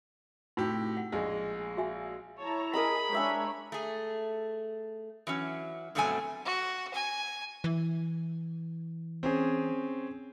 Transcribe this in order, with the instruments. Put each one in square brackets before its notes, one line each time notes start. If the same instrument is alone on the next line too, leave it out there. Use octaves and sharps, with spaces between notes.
[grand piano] A2 C3 G4 [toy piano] D#4 E4 F#4
[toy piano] F#5
[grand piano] A#1 G#3
[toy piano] F#4 E5 G#5
[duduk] E4 [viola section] C#5 A5 A#5
[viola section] G#4 [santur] A#4 D#5 A#5 [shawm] B5
[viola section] G#3 C#5 [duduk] D4 [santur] C5 E5 G#5
[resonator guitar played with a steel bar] A3 G#4
E3 F#3 C#4
G2 B2 F#3 A3 C4 G#5
[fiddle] F#4
G#5
[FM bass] E3
[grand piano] C4 C#4 G#4